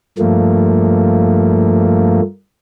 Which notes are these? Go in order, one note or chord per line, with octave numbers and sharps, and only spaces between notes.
G2 F3 A3 A#3